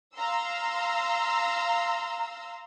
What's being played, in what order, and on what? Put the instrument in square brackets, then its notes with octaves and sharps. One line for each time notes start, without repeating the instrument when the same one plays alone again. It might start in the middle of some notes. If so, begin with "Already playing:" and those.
[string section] F5 A#5 C6 E6